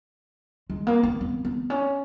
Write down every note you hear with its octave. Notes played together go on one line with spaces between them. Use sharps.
G#3
A#3
B3
B3
B3
C#4